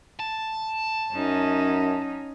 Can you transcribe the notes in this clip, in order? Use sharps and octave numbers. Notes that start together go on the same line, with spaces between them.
A5
F#2 C#4 D#4